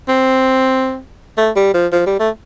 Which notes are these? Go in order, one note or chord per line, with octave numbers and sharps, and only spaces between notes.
C4
A3
G3
F3
F3
G3
A3